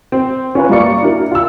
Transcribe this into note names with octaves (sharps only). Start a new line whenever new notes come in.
C4
C#4 F4 B4
G2 A#3 F4 D5 C#6 C#7
D4 E4 F#4 A#4
F4 E6